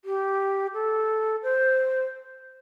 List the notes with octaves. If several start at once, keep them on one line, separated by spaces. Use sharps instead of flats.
G4
A4
C5